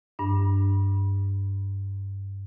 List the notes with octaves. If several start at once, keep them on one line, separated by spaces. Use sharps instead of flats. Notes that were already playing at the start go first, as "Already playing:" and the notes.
G2 D4